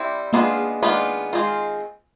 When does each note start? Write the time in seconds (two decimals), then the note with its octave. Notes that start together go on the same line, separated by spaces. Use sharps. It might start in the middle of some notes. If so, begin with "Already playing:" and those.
Already playing: G3 C4 E4
0.33 D#3 G#3 A#3 B3 D4 F4
0.83 D#3 G#3 B3 D4 F4
1.33 D#3 G#3 C4 F4